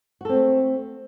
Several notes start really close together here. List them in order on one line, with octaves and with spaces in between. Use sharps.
F#4 A4 C4 A3